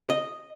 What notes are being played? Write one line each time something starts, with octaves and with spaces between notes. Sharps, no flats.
D#5